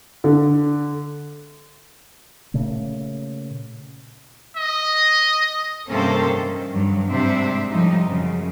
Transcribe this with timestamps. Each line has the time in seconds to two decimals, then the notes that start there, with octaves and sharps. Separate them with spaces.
0.24 D3
2.54 A#2 C#3 A3
4.56 D#5
5.90 G2 C3 A#3 C#4 A4 C5
6.33 D#3
6.70 G2 F#3
7.10 G#2 C3 G3 D4 C5 E5
7.70 A2 C3 F3 G3 D#4
8.04 F#2 C#3